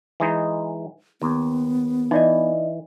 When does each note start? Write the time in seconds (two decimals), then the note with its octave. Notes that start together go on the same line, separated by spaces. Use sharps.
0.20 E3 G#3 D#4
1.22 D#2 B3
2.11 E3 D#4 D5 D#5